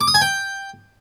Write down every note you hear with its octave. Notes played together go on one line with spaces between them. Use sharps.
D6
D#6
G#5
G5